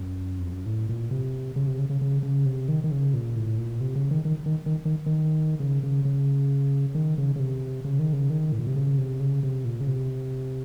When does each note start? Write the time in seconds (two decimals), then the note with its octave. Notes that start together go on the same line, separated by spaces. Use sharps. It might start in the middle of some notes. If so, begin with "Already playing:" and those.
Already playing: F#2
0.40 F2
0.52 F#2
0.66 A2
0.89 A#2
1.11 C3
1.56 C#3
1.67 C3
1.79 C#3
1.90 C#3
2.01 C#3
2.23 C#3
2.46 C3
2.68 D#3
2.84 D#3
2.91 C#3
3.14 A#2
3.36 A2
3.58 A#2
3.81 C3
3.96 C#3
4.11 D#3
4.25 D#3
4.46 D#3
4.66 D#3
4.85 D#3
5.06 D#3
5.60 C#3
5.83 C#3
6.05 C#3
6.95 D#3
7.18 C#3
7.36 C#3
7.40 C3
7.85 C#3
7.99 D#3
8.13 C#3
8.30 D#3
8.52 A2
8.59 A#2
8.67 C3
8.76 C#3
8.98 C3
9.20 C#3
9.43 C3
9.65 A#2
9.81 C#3
9.87 C3